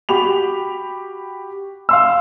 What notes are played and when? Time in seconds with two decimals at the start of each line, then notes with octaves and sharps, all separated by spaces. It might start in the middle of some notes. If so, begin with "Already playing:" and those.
0.09 F#4 G4 B5 F7
1.89 F5 C6 E6